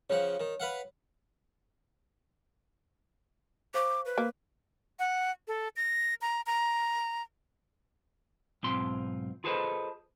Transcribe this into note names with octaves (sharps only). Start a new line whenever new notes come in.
C#3 F3 C#5 F#5
D#3
B4 F5 F#5
C5 F5 C#6 D6
B4
A#3
F#5
A4
A#6
A#5
A#5
B1 G#2 C4 F4 C6
F4 G#4 A4 B4 C5 D#5